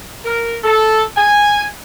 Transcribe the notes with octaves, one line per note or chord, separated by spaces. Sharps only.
A#4
A4
G#5